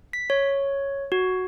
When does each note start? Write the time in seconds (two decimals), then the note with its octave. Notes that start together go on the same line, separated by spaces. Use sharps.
0.13 B6
0.30 C#5
1.12 F#4